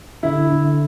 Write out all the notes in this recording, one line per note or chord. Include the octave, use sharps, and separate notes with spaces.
D3 E4
D3